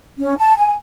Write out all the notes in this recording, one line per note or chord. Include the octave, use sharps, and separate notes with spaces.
C#4
A5
G#5